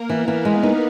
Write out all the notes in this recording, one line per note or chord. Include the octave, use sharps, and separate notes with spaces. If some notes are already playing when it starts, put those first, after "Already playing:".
Already playing: A#3 A#4
E3 B3 B4
E3
G#3
D#4